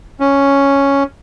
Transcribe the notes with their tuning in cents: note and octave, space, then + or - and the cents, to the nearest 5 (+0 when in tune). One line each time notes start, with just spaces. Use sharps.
C#4 +0